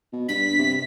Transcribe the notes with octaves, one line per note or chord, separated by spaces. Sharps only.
B2
G2 B6
C3